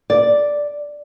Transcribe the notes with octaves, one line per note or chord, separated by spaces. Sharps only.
D5